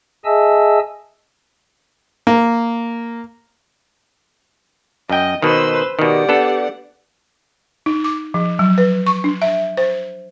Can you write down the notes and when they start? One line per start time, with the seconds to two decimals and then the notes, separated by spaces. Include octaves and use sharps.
0.25 G#4 D#5 E5 G#5 A5 E6
2.27 A#3
5.09 F#2 D#5 G5
5.42 B2 D#3 B4 C5 E6
5.99 B2 D#3 G4 D5 F#5
6.29 B3 D4 A4
7.86 D#4
8.04 D6
8.34 F3
8.59 F#3
8.78 B4
9.07 C#6
9.24 D4
9.42 E5
9.77 C5